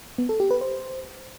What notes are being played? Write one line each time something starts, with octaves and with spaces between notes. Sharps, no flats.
B3
A4
G4
B4
C5